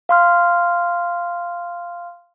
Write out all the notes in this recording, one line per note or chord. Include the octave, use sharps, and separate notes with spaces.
F5 C6 F6